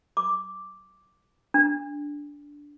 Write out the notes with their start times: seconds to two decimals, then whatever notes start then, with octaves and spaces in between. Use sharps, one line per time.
0.17 D6
1.54 D4